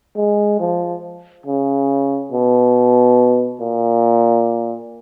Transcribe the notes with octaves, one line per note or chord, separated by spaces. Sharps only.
G#3
F3
C#3
B2
A#2